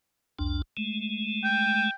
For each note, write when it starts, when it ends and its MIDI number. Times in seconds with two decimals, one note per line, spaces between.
0.39 0.62 36
0.39 0.62 41
0.39 0.62 62
0.77 1.91 56
0.77 1.91 57
1.44 1.94 79